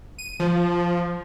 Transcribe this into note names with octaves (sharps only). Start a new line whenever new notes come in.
D#7
F3